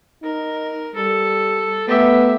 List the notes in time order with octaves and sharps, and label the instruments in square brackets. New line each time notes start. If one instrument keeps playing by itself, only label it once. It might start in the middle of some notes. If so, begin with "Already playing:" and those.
[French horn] D#4 [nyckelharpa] A#4
[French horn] G3 [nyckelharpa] A4
[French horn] A3 [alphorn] B3 [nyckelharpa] G4 E5